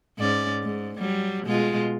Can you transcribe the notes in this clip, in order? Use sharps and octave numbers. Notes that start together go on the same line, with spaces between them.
G#2 C#4 D5
G#2
F#3 G3
B2 G#3 F4